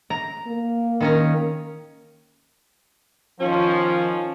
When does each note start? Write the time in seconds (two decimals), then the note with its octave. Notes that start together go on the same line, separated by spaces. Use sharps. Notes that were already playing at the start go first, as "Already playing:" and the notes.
0.10 A#5
0.47 A#3
1.00 D#3 C#4 A#5
3.40 D#3 F3 C#4 F4